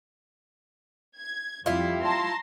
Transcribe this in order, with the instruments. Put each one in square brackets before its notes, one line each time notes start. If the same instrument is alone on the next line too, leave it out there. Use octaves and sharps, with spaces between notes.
[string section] G#6
[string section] F2 G3 [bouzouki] E4 F4
[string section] A5 A#5 C6